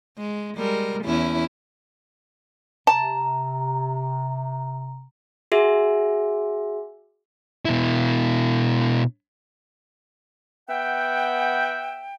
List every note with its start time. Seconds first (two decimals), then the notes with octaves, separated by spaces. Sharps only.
0.18 G#3
0.57 G3 G#3 A#4
1.05 E2 C#4 E4
2.87 C3 A5 A#5
5.52 F#4 G#4 E5
7.65 B2 E4
10.69 B3 E5 F#5 G5